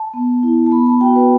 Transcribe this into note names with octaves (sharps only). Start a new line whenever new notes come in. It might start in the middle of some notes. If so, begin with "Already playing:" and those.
Already playing: A5
B3
E4
A5
B3 B5
A5
F#4 G5
B4